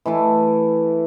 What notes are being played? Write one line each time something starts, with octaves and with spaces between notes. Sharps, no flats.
E3 A3 E4 A5